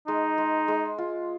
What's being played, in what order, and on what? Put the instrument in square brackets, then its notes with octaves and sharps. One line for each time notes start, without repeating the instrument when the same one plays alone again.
[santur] G#3 [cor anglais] D#4
[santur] G#3
G#3
F4